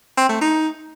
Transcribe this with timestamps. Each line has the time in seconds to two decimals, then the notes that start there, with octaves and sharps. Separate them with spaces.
0.17 C4
0.29 A3
0.41 D#4